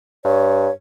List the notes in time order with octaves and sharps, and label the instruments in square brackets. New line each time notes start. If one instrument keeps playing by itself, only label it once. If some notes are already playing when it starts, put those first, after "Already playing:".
[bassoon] G2 [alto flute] C#5